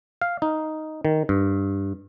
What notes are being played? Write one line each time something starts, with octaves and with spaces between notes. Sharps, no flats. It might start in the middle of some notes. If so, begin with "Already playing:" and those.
F5
D#4
D#3
G2